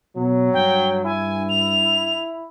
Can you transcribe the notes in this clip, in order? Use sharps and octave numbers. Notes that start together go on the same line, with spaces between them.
B2 F#3
G2 G5
E4 G#5
F7